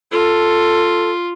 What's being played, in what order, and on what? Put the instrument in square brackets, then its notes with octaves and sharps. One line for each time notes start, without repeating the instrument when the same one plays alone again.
[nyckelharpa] F4 [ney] A4